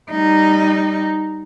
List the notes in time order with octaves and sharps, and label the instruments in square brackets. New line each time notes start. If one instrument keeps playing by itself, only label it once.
[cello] G3 D#4